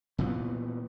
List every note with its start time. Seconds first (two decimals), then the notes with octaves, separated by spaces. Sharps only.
0.18 A#2 E3 B3